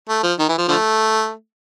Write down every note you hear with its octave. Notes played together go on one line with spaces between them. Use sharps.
A3
F3
D#3
E3
F3
D3 F3 A3